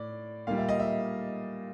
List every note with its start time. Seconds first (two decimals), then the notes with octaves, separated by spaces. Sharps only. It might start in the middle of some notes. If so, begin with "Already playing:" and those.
Already playing: A2 D5
0.47 A#2 G3 F5
0.58 E5
0.69 D#5
0.79 E5